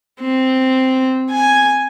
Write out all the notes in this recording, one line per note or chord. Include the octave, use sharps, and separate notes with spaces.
C4
G#5